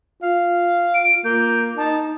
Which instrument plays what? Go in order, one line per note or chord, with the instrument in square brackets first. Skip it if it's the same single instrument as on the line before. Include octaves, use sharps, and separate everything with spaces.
[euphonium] F4 [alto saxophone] F5
[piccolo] D7
[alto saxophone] A#3 [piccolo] G6
[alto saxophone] D#4 [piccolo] A5